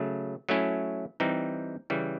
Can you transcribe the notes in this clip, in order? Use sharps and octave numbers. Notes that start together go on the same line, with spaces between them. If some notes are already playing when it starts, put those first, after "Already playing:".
Already playing: C#3 F#3 A3
F#3 A3 C#4 E4
E3 G3 C4 D#4
C#3 E3 G3